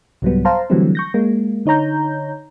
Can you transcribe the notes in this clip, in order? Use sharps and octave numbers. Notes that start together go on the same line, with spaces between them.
C2 G#2 F#3 G3 B3
C5 F5 A5 A#5 C6
D3 E3 F#3 G3 A3 C4
C#6 G6 A#6
G#3 A#3
D3 D#4 C#5 A#5 G6